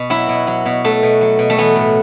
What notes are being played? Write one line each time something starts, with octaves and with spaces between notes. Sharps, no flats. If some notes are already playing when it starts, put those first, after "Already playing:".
Already playing: B2
F#3 E4
B2
F#3
B2
F#3 A3
B2
F#3
B2
A3
E3 B3
A2